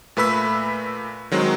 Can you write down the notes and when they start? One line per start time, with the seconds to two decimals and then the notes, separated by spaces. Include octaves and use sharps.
0.17 A#2 A3 B4 B5 E6 B6
1.32 D#3 F#3 G#3 C4